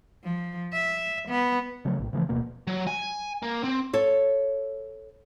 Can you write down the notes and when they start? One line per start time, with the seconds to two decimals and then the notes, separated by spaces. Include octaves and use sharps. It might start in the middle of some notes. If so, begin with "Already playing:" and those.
0.24 F3
0.73 E5
1.28 B3
1.85 C#3 F3 F#3 A3
1.99 A#1 A2
2.13 C#3 E3 F3 A3
2.29 D1 B2 A#3
2.67 F#3
2.87 G#5
3.42 A#3
3.63 C4
3.93 A4 C#5